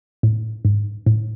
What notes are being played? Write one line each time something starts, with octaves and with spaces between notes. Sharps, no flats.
A2
G#2
A2